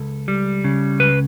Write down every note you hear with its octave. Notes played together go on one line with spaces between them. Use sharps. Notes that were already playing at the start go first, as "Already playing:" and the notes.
Already playing: C#2 A4
G3
C#3
C#2 B4